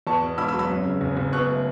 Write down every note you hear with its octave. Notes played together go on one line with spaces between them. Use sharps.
E2 A5 C#6
B2
E1 B5 E6
B5 E6
F#3
B5 E6
F#2
C#3
F#1
F#1
B2 C#6 F#6
A3